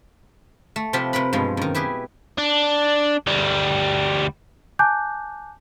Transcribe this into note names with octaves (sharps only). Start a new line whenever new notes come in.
A3
C3 F3 F4 G4 E5 B5
C3 C4 A#4 B4 B5
G2 B2 F3 G#3
F#2 D#3
E4 G4 G#4 B4
D4
D2 G3
G#5 A5 D6 F#6 G6